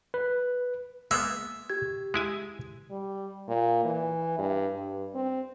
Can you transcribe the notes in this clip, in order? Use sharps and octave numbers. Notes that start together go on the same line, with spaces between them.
B4
G#3 A#3 B3 E5
G4 G#6
G#3 E4 G#5
G3
A#2
E3
G2
G2
C4